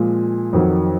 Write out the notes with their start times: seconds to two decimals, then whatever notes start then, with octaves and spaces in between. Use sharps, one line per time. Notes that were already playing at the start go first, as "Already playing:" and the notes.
Already playing: A#2 F3 G#3
0.53 F2 D#3 F#3